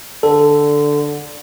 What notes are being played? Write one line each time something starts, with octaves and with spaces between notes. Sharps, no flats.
D3 A4